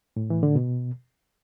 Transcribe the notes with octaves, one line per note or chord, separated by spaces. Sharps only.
A2
E3
D3
B2